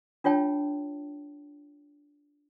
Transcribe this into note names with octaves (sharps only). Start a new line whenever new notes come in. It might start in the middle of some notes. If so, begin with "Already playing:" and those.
D4 F4 C#5 G5 A5